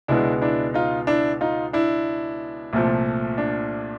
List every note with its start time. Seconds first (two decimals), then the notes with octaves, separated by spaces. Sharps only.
0.08 C#2 B2 G#3 B3 D4 E4
0.42 D4 E4
0.74 D#4 F4
1.07 D4 E4
1.41 D#4 F4
1.73 D4 E4
2.73 C2 A#2 F3 A3
3.38 D4